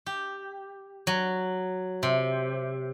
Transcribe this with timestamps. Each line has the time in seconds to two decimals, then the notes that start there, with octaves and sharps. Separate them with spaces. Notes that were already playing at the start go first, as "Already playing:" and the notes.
0.06 G4
1.07 F#3
2.03 C3